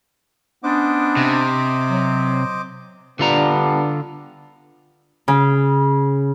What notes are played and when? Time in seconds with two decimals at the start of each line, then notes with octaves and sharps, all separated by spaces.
0.63 B3 C#4 D4 C5 D#5 D6
1.17 C3
1.90 F#3
3.19 D3 G3 B3 D4 F4 A#5
5.28 C#3